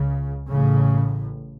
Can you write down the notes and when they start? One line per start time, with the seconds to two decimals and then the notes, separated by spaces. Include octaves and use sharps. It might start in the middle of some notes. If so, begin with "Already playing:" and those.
Already playing: C#2 C#3
0.51 A1 A2 C#3